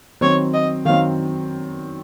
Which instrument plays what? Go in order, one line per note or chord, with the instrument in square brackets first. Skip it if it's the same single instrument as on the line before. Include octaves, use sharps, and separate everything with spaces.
[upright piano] D#3 F#3 C4 [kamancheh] C#5
[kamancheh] D#5
[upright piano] D#3 F#3 C4 [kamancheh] F5